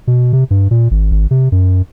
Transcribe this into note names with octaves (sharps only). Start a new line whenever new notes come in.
B2
C3
G2
A#2
G#1
G#1
C3
F#2